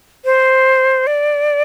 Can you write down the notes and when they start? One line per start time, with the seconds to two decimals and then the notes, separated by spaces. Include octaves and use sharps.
0.25 C5
1.07 D5